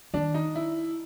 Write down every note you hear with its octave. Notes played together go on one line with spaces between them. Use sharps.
D#3 D4
D#4
E4